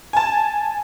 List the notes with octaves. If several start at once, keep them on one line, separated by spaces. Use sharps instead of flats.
G#5 A5